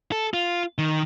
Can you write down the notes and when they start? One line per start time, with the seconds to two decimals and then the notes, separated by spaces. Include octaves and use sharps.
0.12 A4
0.34 F4
0.78 D#3